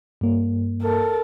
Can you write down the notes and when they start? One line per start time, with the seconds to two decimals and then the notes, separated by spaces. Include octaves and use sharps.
0.21 G2 A#3
0.82 A4 A#4